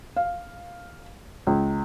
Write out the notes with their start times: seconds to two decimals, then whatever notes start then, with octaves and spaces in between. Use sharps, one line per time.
0.17 F5
1.47 C#2